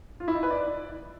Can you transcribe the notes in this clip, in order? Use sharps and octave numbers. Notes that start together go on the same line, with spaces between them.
F4
E4
D#4
B4
D5